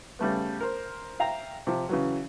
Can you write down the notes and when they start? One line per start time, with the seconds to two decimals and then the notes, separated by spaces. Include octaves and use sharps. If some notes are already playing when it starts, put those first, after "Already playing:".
0.19 C#3 G3 A3 B3
0.61 A#4 C5
1.20 E5 F5 G5 A#5
1.67 C3 F3
1.89 C#3 E3 F#3